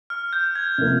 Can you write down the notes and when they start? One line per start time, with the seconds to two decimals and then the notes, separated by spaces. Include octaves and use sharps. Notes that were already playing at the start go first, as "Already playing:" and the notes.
0.10 F6
0.33 G6
0.55 G#6
0.78 C3 F3 A#3